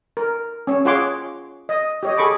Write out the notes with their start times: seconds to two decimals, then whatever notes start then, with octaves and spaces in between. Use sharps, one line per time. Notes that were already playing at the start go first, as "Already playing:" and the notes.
0.17 A#4
0.67 C#4 C#5
0.85 F4 G#4 C#5 F#5 C6 D6
1.69 D#5
2.03 G4 C#5 D#5
2.17 G#4 A4 B5 C#6 D6